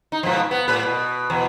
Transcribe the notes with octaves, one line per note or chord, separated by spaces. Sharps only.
D#4
G#2 B2 F3
B3
A2 B4
B2
E2 B2